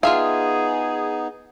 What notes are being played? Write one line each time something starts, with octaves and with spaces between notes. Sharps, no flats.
B3 D#4 F4 G#4 E5 F5